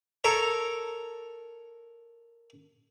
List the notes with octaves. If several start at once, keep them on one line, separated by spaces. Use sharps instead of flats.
A4 A#4 C#5 A#5